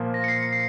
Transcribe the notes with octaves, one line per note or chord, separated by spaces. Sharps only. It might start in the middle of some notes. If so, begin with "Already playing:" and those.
Already playing: A#2 F3 A#3
A#6
C#7
C7
C#7
C7